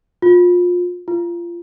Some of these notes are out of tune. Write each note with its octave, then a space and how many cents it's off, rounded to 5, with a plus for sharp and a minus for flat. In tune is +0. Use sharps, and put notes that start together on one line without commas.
F4 +25
F4 -25